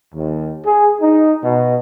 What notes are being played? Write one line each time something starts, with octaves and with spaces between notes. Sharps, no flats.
D#2
G#4
D#4
B2